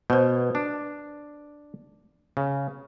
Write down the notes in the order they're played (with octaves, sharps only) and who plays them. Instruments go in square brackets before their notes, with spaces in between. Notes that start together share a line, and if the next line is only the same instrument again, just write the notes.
[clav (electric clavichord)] B2 [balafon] B4 C5
[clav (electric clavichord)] D4
C#3